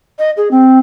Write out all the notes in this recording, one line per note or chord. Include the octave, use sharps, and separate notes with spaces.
D#5
G#4
C4